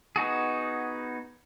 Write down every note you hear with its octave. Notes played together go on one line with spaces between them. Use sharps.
B3 D#4 F#4 G#4